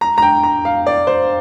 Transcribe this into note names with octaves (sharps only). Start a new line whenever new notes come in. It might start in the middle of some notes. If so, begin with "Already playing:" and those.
A#5
A#5
G5
A#5
F5
D5
C5